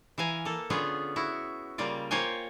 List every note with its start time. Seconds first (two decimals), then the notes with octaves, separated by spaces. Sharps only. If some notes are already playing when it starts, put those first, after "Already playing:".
0.18 E3 F5 G#5 A#5
0.45 A#3 A4
0.70 D3 B3 C#4 F4 G#4
1.16 E4 F#4
1.78 C#3 G3 A#3 F4 D5
2.11 A#3 F4 C5 C#5 G5 G#5